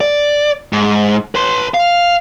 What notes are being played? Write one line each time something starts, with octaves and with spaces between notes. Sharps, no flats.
D5
G#2
B4 C6
F5